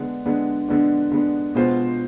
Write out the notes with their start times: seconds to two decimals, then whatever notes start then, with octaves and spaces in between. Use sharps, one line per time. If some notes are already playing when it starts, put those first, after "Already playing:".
Already playing: D3 G#3 B3 D4
0.26 D3 G#3 B3 D4
0.69 D3 G#3 B3 D4
1.12 D3 G#3 B3 D4
1.55 B2 G#3 B3 F4 C5